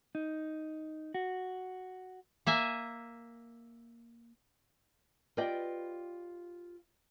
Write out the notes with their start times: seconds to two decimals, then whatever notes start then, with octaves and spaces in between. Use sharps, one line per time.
0.15 D#4
1.14 F#4
2.47 A#3 E5 G#5
5.37 F4 G4 B4 D5 D#5 G5